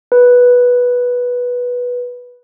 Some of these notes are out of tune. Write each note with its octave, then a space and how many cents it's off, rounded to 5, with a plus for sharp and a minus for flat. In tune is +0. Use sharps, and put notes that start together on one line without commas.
B4 -10